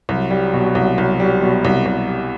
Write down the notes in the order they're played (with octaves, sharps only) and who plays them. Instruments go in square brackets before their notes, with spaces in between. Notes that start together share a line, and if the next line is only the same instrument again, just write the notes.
[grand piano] C2 [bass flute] F#3
[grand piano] G3
B2
C2
C2
G3
B2
C2
C2
G3